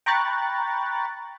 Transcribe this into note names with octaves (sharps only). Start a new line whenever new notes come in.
G5 A#5 B5 C#6 F#6 A6